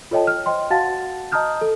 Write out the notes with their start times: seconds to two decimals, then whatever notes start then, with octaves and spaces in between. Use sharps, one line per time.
0.11 F4 A4 C#5 D#5 G5 A5
0.27 F6
0.46 C5 D#5 G5 C6
0.70 F#4 F5 F#5 A5 A6
1.32 D#5 A5 A#5 D#6 F6 G6
1.61 A4